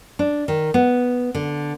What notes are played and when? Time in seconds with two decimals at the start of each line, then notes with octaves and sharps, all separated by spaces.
0.19 D4
0.48 D#3
0.74 B3
1.35 D3